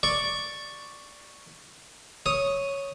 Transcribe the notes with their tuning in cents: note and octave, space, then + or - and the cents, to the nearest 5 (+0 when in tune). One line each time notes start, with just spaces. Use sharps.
D5 +0 C#6 +0
C#5 +0 D#6 +0